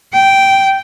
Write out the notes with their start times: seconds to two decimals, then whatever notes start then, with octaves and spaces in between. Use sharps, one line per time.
0.13 G5